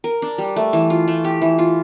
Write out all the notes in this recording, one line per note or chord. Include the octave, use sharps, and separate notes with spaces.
A#4
D4
G3
A3
E3
F4
A3
G4
E3
F4